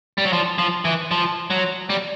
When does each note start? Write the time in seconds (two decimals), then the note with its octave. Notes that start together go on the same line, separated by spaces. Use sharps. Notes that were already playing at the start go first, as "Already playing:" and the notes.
0.18 G3
0.25 F#3
0.33 F3
0.59 F3
0.85 E3
1.11 F3
1.50 F#3
1.90 G3